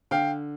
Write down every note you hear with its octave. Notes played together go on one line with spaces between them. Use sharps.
D3 F5 G5